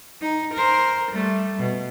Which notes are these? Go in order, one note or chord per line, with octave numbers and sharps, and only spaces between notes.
D#4
A#4 C5
G3 A3
B2